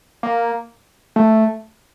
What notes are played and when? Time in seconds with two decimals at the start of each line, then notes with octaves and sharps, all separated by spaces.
0.23 A#3
1.16 A3